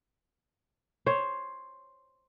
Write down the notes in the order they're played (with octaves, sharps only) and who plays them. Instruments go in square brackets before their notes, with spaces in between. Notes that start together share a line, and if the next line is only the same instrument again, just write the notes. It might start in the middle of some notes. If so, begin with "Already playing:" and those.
[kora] C5 C#5